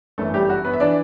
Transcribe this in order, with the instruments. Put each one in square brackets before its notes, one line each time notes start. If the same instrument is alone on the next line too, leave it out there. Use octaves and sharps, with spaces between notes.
[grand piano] G1 F#2 E3 A3 A4
G3 G4
F#4
B3 B4
E5
E3 D4 D5